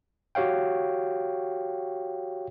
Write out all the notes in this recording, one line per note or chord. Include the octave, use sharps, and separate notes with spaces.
F#4 G4 C#5 F5 G5